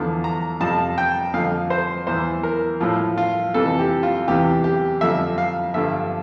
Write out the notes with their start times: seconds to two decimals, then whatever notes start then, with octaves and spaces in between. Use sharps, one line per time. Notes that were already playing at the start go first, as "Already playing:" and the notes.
Already playing: E2 D3 F3
0.24 A#5
0.60 F2 C3 F3 A5
0.98 G5
1.34 F2 D3 F3 F5
1.70 C5
2.07 E2 E3 C5
2.43 A#4
2.81 A2 F3 F4
3.18 F4
3.54 F2 C3 E3 A4
3.79 G4
4.03 F4
4.28 E2 C3 E3 G4
4.64 G4
5.01 F2 D3 F3 E5
5.38 F5
5.74 G2 D3 F3 E5